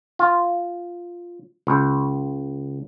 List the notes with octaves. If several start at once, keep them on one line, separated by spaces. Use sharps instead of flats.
F4
C#2